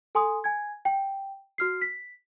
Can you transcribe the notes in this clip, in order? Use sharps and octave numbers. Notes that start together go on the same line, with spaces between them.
A4 G#5 C6 D#6
G#5 G#6
G5
F#4 F6 C7
B6